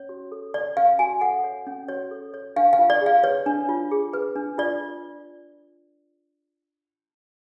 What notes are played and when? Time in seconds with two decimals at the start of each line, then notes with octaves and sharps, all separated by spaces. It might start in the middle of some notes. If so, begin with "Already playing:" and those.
Already playing: C#4 C#5
0.09 F#4
0.32 A4
0.54 C#5 D5
0.77 C#4 F5
0.99 F#4 G#5
1.21 A4 F#5
1.44 C#5
1.67 C#4
1.88 F#4 C#5
2.11 A4
2.34 C#5
2.56 D4 F5
2.73 F5
2.79 F4
2.90 D5
3.01 G#4
3.06 F5
3.24 B4 C#5
3.46 D4
3.69 F4
3.91 G#4
4.13 B4
4.36 D4
4.58 F4 D5